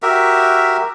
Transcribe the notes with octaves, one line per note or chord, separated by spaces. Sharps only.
F#4 G4 A#4 E5